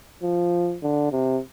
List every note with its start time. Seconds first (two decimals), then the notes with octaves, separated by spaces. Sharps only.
0.23 F3
0.83 D3
1.12 C3